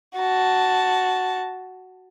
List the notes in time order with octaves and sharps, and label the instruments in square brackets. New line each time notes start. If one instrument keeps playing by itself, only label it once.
[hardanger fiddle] F#4 A5